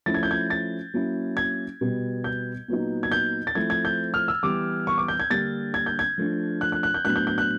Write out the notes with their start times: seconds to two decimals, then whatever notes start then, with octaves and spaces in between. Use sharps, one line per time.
0.06 F3 A3 C#4 E4 A6
0.14 G#6
0.23 G6
0.31 G#6
0.50 A6
0.94 F#3 A#3 C#4 E4
1.37 G#6
1.81 B2 G3 B3
2.24 G6
2.68 A#2 F#3 B3 D#4
3.03 G#6
3.12 G6
3.47 A6
3.55 F3 A3 C4 E4 G#6
3.70 G#6
3.85 G6
4.14 F6
4.28 E6
4.43 E3 G3 B3 D6
4.87 C#6
4.98 D6
5.08 G6
5.20 G#6
5.30 D3 G3 A#3 D4 A6
5.74 G#6
5.86 G6
5.99 G#6
6.18 F3 A3 D4
6.61 F#6
6.72 F#6
6.83 F#6
6.94 G6
7.05 A2 F#3 B3 D4 F#6
7.16 G6
7.27 G6
7.38 F#6